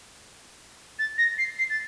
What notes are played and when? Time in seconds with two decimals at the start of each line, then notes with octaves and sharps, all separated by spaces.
0.99 A6
1.18 A#6
1.38 C7
1.59 C7
1.70 A6